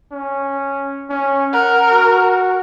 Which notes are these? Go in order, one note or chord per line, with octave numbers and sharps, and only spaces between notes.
C#4
C#4
A#4 F#5
F#4